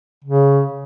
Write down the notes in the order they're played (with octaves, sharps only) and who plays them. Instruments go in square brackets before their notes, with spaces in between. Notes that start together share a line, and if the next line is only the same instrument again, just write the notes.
[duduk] C#3